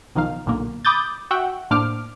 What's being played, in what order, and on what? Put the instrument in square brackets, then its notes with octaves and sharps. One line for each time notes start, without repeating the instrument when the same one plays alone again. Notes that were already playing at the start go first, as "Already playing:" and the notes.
[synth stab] B1 D#3 F3 D#4 F5
B1 A#2 D3 A#3
B5 D6 D#6 G6 A6
F#4 E5 F#5 G5
A2 A#3 D4 C5 D6 F6